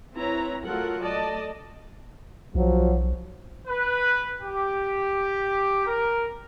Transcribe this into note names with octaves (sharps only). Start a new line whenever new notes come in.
C4 E4 B4 C#5 A#5
F#3 A3 F4 A4 A#4 F#5
A3 D5 D#5 A5
B1 F3 F#3
B4
G4
A#4